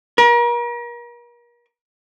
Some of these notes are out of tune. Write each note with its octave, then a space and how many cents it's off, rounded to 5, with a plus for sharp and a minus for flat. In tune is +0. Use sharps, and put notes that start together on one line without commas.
A#4 +40